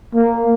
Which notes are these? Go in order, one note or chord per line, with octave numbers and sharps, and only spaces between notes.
A#3